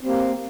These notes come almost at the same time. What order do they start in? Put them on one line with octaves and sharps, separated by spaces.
C4 G3 A#3